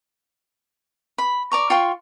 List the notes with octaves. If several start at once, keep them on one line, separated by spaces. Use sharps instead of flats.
B5
D5 A#5 C#6
F4 G5 C6 C#6